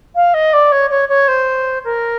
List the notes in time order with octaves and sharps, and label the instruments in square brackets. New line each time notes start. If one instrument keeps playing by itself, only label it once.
[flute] F5
D#5
D5
C#5
C#5
C#5
C5
A#4